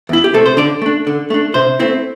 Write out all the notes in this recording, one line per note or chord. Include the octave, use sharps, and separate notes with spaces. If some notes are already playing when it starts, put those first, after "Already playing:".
E2 E4
G4
C3 A3 C4 A4
C5
D3 D5
A3 D4
D3
A3 D4
C3 C5
A3 C4 E4